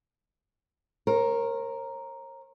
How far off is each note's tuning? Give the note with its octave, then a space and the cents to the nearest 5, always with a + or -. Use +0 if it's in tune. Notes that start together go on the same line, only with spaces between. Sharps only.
A#4 +0 C#5 -45